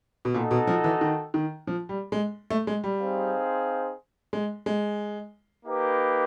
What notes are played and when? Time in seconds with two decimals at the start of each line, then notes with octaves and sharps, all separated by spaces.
0.25 B2
0.34 A#2 D#4 F#4 A4
0.51 B2
0.67 F3
0.84 E3
1.01 D#3
1.34 D#3
1.67 F3
1.89 G3
2.12 G#3
2.50 A3
2.67 G#3
2.84 G3
3.00 C4 D#4 G#4 C5 F5
4.33 G#3
4.66 G#3
5.66 A#3 D#4 G4 B4